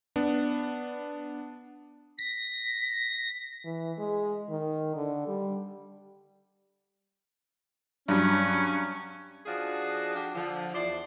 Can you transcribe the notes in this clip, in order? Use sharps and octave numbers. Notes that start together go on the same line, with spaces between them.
B3 D4
A#6 B6
E3
G#3
D#3
D3
G3
G2 F#3 C#4
F3 D4 D#4 F#4 G#4
D4 F#4 G4
D3 F3
E2 E4 C5 D5